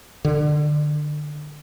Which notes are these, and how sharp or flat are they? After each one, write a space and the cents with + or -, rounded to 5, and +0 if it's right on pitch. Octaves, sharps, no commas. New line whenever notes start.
D3 +20